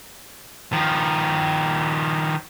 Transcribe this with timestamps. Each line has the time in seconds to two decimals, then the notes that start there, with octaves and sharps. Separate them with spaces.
0.73 D#3 F3